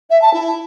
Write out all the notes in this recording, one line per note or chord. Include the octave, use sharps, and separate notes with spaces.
E5
A5
E4